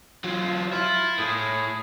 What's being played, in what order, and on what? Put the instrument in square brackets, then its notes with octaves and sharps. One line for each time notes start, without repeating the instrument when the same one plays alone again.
[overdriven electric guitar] F#3 F4
[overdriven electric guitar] E4 [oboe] F4
[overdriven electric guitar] A2 [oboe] G#4